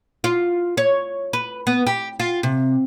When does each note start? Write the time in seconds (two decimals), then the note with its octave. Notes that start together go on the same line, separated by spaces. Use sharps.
0.24 F4
0.77 C#5
1.33 B4
1.67 B3
1.87 G4
2.20 F4
2.43 C3